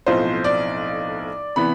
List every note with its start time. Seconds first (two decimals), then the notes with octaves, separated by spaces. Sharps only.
0.07 B1 A2 F3 C4 F4 C5
0.44 D5
1.56 C3 E3 B3 B5